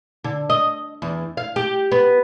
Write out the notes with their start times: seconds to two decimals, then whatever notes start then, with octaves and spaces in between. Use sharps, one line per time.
0.24 D3
0.50 D#5
1.02 E2
1.37 F5
1.56 G4
1.92 B3